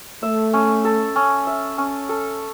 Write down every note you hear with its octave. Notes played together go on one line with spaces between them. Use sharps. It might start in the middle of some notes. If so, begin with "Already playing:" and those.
A3 E5
C#4
A4
C#4
E5
C#4
A4